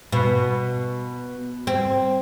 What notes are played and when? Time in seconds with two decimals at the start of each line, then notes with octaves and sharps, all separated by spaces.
0.12 B2
1.67 C4